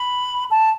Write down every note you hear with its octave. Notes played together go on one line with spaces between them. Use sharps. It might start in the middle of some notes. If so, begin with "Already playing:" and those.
Already playing: B5
A5